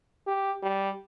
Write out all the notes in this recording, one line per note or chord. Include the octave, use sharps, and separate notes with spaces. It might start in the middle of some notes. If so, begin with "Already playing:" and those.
G4
G3